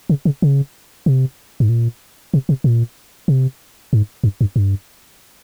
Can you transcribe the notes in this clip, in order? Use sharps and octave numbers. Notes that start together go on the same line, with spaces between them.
C#3
C#3
C#3
C3
G#2
A#2
C3
C3
A#2
C3
G#2
G2
G2
G2